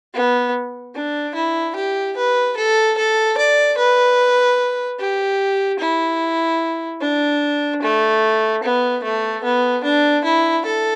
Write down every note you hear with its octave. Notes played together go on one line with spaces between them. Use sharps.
B3
D4
E4
G4
B4
A4
A4
D5
B4
G4
E4
D4
A3
B3
A3
B3
D4
E4
A4